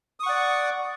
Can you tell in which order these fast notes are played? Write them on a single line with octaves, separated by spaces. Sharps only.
D#6 C#6 F#5 D5